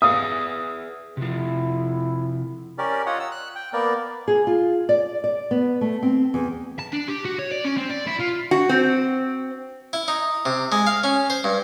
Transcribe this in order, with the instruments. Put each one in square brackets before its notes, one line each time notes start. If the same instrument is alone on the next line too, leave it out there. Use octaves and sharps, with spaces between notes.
[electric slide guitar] G#4 B4 E5 [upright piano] D#6
[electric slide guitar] C3 F3 [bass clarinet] E4
[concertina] C#4 G4 A#4 D5
F4 C#5 D#5 F#5
E6
F#6
G5
A#3 B3 A#4 D5
[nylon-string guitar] G#4
F4
D5
D5
B3
A3
C4
E2
[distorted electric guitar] A5
D4
G4
F#4
C#5
D5
C#4
C4
D5
E4
F4
[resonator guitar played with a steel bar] F#4
C4
[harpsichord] E4
D#4
C3
G#3
F5
C#4
C5
G2